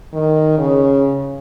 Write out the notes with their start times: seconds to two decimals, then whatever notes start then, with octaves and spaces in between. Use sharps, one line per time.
0.13 D#3
0.58 C#3